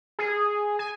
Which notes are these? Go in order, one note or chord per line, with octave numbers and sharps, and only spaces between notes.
G#4
G#5